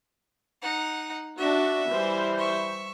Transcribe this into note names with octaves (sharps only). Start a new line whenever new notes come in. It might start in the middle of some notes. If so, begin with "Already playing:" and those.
D#4 F#5
D4 F#4 E5
E3 G3 C5
E5 C#6